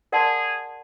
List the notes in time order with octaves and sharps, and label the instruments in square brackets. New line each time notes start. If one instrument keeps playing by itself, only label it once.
[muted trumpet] G#4 [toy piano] A#4 D5 F#5 A5 C6